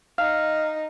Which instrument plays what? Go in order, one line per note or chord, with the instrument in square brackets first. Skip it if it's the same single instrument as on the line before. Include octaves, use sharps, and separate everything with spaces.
[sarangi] D#4 [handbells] F5 F6